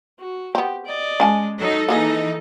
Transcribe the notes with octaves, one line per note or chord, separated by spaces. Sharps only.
F#4
B3 C4 G4
D5 D#5
G#3 C#4 G#5 A5
F#3 D#4 A4
E3 A#3 D#4 G#4 D#5